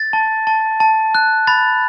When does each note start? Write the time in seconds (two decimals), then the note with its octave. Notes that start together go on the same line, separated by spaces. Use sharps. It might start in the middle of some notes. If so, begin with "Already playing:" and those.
Already playing: A6
0.13 A5
0.47 A5
0.80 A5
1.15 F#6
1.47 B5 A6